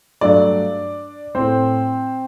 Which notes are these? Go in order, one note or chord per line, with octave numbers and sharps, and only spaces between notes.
G2 F#3 A3 D4 D5
A2 A3 C4 C5